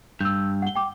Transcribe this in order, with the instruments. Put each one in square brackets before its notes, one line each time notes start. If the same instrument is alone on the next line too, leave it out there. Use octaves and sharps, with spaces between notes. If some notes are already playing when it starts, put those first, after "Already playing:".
[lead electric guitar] G2 [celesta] E6 G6
[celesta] F#5 G7
G5 D6